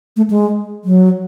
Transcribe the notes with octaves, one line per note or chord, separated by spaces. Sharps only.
A3
G#3
F#3